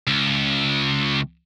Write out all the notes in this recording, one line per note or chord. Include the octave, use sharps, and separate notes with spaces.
C#2